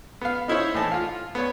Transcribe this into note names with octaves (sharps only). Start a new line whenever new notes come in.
B3 F5
D#4 E4 C5 C#5
A2 E3 A5
F4 F5
B3 C#5